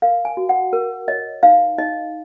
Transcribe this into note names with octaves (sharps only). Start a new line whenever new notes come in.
A#4 F5
G#5
F#4
F#5
A#4
C#5 D#5
D#4 F5
D#4 D#5